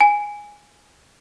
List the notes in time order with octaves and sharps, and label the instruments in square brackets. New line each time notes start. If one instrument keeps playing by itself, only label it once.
[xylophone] G#5